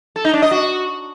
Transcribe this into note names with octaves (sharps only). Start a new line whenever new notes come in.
A4
D#4
D4
D#5
F#4